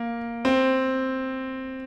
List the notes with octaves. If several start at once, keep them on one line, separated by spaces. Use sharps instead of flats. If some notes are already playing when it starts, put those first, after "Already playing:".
Already playing: A#3
C4